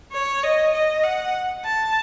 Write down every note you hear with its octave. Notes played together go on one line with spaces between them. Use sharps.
C#5
D#5
D#5
F#5
A5